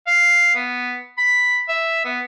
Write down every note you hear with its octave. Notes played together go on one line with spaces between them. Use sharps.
F5
B3
B5
E5
B3